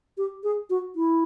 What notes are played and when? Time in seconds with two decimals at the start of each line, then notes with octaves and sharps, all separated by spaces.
0.18 G4
0.43 G#4
0.70 F#4
0.96 E4